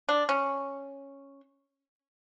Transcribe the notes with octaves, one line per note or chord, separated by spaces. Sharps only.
D4
C#4